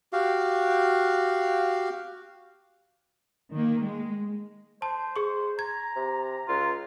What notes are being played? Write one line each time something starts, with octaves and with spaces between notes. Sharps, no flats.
F#4 G4 F5
D#3 A#3
G#3
C5 A5
G#4 C#6
A#5 G#6
C3
C#2 F4